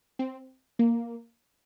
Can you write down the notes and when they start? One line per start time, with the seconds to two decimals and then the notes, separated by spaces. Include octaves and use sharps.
0.19 C4
0.79 A#3